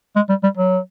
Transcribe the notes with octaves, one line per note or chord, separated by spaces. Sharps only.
G#3
G3
G3
F#3